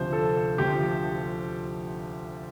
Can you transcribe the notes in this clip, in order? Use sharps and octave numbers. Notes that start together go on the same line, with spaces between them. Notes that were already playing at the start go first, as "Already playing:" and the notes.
Already playing: D2 C3 F3 C5
A4
D2 C3 F3 G4